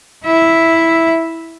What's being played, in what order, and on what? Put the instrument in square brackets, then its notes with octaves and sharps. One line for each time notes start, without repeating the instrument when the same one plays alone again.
[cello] E4 E5